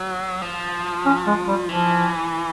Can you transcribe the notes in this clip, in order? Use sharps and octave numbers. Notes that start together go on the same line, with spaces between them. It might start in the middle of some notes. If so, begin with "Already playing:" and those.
Already playing: F#3
F3
C#4
G#3
G3
E3 F3